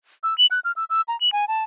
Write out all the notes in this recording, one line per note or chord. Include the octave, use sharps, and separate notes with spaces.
E6
F#7
F#6
F6
E6
E6
A#5
F#7
G#5
A5